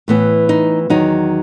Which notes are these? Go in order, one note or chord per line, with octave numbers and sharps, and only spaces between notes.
A2 E3 B3
D#4
E2 D#3 F#3 D#4